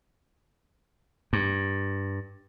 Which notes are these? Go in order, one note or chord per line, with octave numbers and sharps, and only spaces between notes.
G2